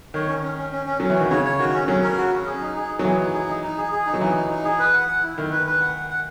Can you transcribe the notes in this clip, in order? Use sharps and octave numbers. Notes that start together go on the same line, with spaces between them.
D#3 C#5
C#4
C#4
C#4
C#4
C#4
F#3 C#4
E3
D#3 F#4
C#3 C#5
C#5
D#3 F#4
C#4
F#3 C#4
A#4
F#4
C#4
G#4
D#4
G#4
D#4
F#3
E3 G#4
D#4
G#4
D#4
D#4
G#4
G#4
D#4
F#3
E3 D#4
D#4
D#4
G#4
B4
F#5
F#5
E4
D#3 E4
B4
B4
F#5
F#5
F#5